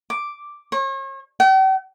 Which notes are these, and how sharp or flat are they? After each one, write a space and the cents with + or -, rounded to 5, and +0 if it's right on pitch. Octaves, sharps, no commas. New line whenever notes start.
D6 +0
C#5 -40
G5 -45